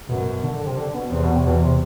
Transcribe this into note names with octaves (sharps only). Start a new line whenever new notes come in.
F#2 B2
B2
D3
D3
C3
D3
B2
E2 C3
B2
C3
E2 B2
C3